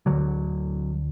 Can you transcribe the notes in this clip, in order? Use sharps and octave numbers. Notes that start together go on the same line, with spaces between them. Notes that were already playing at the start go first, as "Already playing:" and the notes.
D2 D3 F#3